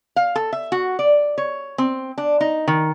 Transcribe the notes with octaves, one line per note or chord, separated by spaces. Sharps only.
F5
A4
E5
F#4
D5
C#5
C4
D4
D#4
D#3